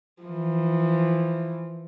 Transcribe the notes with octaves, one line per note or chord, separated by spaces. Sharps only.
E3 F3